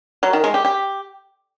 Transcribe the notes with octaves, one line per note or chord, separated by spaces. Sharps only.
F#3
D#3
G#3
G4
G4